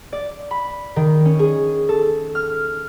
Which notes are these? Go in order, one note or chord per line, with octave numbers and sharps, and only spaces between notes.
D5
B5
D#3
C#4
G#4
A4
F6